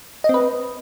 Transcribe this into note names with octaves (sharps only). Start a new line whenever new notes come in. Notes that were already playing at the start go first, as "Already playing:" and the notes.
C4 B4 D#5